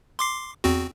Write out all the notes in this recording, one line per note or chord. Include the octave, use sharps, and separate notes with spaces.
C6 D6 C7
E2 C4 F#4